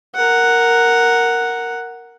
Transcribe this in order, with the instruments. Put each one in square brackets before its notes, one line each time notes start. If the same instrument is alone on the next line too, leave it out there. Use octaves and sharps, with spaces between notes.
[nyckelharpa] A#4 F#5